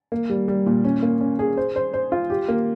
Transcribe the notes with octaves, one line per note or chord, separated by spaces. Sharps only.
A#3
G3
G3
A#2
C#4
A#3
C#4
G#4
C5
C5
C5
F4
G4
A#3